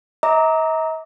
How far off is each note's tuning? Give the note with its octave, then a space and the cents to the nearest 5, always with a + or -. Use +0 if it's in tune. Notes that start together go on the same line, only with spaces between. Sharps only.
D#5 +45 A#5 +0 D6 +0